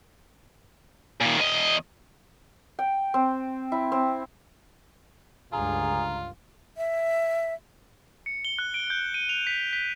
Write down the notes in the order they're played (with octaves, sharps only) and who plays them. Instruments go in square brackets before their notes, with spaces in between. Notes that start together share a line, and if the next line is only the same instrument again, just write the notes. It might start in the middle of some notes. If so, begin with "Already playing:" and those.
[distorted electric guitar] A#2 D#3
E2 D#5
[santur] G5
C4
E4
C4
[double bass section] C#2 G2 D3 [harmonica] F4 [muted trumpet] G#4 [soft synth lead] A#5
[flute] E5
[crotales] C#7
G7
F#6
D7
G6
D#7
F7
B6
B6